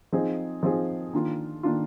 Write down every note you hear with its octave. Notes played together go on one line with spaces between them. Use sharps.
F3 C4 D#4 G#4
F3 C4 D#4 G#4
D#3 A#3 D4 F4
D#3 A#3 D4 F4